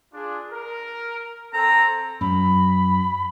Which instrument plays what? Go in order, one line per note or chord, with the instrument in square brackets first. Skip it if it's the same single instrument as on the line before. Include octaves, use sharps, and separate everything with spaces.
[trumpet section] D4 F4 G#4
A#4
[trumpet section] C4 A4 [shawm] A#5
[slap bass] F#2 F#3 [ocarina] B5